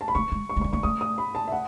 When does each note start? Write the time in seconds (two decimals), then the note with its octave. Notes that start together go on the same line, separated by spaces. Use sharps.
0.01 A5
0.08 B5
0.15 A3 C#6
0.32 G#3
0.49 C#6
0.57 A3
0.61 C#6
0.64 G#3
0.73 A3 C#6
0.83 A3 D#6
1.01 D#6
1.18 B5
1.35 A5
1.48 E5
1.52 F#5